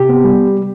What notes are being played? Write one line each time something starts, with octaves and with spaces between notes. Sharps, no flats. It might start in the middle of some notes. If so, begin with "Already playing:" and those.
Already playing: C3 G4
B3
G3